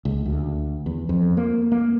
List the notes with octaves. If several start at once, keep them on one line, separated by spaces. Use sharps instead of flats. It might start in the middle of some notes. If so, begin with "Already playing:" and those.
C#2
D2
E2
F2
A#3
A#3